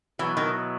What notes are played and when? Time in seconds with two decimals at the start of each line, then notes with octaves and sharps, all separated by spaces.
0.19 B2 E3 F#3 B3 E4
0.37 D#3